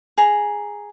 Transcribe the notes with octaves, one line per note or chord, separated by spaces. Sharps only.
G#4 A#5